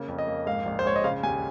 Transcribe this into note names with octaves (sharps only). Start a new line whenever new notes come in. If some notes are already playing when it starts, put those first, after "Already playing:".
Already playing: C#3 A#3
F2
D#5
A#3
G#2 F5
A#1
C5
G#3 C#5
D#5
C#3 F5
D#2 G#5